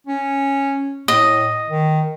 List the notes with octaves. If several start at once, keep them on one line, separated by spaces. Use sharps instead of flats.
C#4
A2 D#5
D#3